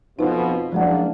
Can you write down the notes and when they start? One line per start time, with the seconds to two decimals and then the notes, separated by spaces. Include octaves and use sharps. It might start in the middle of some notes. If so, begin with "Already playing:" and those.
0.19 F2 B2 F3 D#4 B4
0.72 F#1 F3 G#3 A#3 D4 F#5